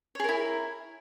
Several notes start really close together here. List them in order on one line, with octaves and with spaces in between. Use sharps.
C#5 G#4 A#4 E4